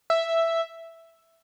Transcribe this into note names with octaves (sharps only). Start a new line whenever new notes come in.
E5